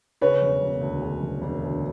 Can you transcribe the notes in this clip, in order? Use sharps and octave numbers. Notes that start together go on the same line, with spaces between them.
C#3 B4 C#5
E1
E1
D2
C#3
E1
E1
D2